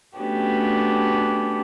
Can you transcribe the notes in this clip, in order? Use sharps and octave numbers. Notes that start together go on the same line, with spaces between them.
A3 B3 C#4 D4 F#4 G4